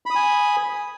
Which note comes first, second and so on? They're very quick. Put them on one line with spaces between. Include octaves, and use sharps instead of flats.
B5 D#6 G#5